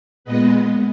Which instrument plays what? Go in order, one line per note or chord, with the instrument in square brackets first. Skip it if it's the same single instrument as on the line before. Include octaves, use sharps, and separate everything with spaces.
[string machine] A#2 G#3 B3 B4 D#5